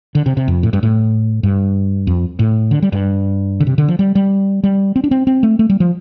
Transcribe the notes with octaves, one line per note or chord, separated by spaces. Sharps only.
D3
C3
C3
F2
A2
G2
A2
G2
F2
A2
D3
G3
G2
D3
C3
D3
F3
G3
G3
G3
C4
D4
C4
C4
A3
A3
G3
F3